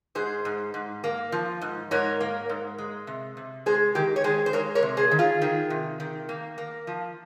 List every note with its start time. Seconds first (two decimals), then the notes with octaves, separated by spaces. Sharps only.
0.15 G#2 G#4 C5
0.45 G#2
0.74 G#2
1.04 A#3
1.32 F3
1.61 G#2
1.91 G#2 A#4 C#5
2.21 A#3
2.49 G#2
2.78 G#3
3.07 C3
3.37 C3
3.66 G#3 G#4 C5
3.95 D#3 G4 A#4
4.16 C#5
4.24 G#3 G#4 C5
4.46 C5
4.53 G#3 A#4 C#5
4.75 A#4 C#5
4.82 C3
4.97 G#4 C5
5.11 D#3
5.19 F4 G#4
5.42 D#3
5.70 C3
6.00 D#3
6.29 A#3
6.58 A#3
6.87 F3